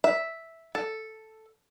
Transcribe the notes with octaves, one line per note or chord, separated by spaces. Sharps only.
E5
A4